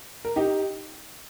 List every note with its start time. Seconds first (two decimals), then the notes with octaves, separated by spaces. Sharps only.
0.25 A#4
0.36 D#4 G4